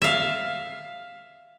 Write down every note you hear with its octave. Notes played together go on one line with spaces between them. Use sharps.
E5 F5